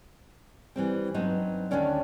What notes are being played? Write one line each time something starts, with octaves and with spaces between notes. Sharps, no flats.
E3 G3 C4
G2 F#3 B3 C4 D#4
D2 D3 D#3 C#4 D5